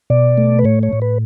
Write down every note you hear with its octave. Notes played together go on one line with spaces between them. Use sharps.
B2 D5
A3
B4
A2 C#5
C#5
A2
B4